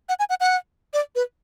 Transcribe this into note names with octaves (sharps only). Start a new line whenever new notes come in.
F#5
G#5
F#5
F#5
D5
B4